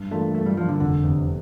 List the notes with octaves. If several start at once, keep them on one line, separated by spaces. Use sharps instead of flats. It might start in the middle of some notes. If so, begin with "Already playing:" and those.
Already playing: G2
E3 A3 A#3 D4 F4
G2 A3
G3
E3 F3 A#3 D4 F4
D3
F1 D3
E2 C3